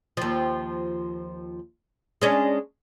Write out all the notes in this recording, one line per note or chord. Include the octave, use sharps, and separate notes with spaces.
D#2 F3
G#3 C#4 D4